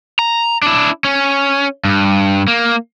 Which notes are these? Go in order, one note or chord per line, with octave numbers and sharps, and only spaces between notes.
A#5
D4 E4
C#4
G2
A#3